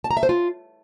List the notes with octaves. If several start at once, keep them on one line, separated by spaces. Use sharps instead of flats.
A5
A#5
E5
C5
F4